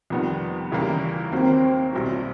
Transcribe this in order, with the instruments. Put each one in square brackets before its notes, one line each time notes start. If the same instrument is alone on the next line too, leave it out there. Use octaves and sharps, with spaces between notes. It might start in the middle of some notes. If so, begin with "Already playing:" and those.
[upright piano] F2 C3 D#3 G3 B3
D#2 C#3 E3 G3 A#3
[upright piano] D#2 D#3 F#3 A#3 [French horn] C4
[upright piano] B1 B2 G3 C4 E4